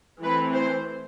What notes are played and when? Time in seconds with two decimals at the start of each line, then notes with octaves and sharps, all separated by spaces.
0.21 E3 A3 C4 B4
0.55 C5